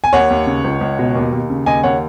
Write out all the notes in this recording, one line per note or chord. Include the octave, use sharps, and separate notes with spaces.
G#5
D#2 C#5 F#5
D#2
C#3
C#2
C#2
B2
D#2
D#2
C#3
D#2 D#5 G#5
D#2 C#5 F#5